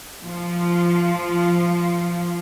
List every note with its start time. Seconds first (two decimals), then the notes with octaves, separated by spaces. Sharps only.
0.23 F3 F4